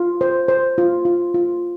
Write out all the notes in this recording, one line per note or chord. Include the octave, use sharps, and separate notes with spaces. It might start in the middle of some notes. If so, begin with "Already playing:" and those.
Already playing: F4
C5
C5
F4
F4
F4